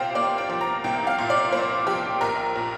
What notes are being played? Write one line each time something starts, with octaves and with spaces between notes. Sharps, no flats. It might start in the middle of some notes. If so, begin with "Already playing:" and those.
Already playing: C2 A#2 F4 G4 C5
A#3 D5
G5
F3
A#5
C2 G5
F5
A#2
D5
A#3 C5
F3 G4
A#1 A#4
A#2